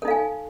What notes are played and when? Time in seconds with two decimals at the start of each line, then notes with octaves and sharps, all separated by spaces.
0.02 A4
0.05 D#4
0.08 F5
0.11 G#5